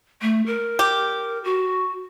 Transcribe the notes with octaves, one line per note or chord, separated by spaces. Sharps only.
A3
A#4
G4
F#4